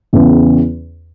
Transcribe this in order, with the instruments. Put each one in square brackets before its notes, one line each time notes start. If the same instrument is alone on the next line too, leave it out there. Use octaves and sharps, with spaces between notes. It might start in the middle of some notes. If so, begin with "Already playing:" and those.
[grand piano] E2 C#3 E3